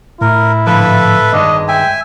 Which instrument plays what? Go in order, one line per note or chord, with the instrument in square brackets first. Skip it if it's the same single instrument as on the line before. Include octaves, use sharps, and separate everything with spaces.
[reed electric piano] A2 [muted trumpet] E4 [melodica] A#4
[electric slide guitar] G#2 D3 F3 [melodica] A4 B4 E5
[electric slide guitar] G2 D#3 G#3 [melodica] D4 [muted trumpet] D#5
[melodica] E5 G#5 [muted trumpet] G5